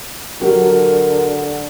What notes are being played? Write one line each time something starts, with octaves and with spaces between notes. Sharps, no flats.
D3 F#3 G4 A#4